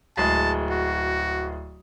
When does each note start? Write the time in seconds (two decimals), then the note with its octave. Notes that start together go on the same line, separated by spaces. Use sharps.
0.17 D1 G#3 G#4 A5
0.70 F#4